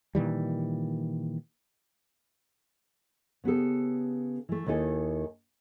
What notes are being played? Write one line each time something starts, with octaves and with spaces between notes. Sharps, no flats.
A#2 D#3 E3 G3
C#3 B3 G4 A4
E3 A3
D#2 D#3 E4 A4 G#5